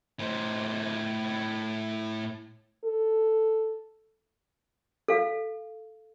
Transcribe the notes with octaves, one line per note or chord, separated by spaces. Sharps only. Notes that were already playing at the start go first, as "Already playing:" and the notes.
A2 C5
A4
A4 F5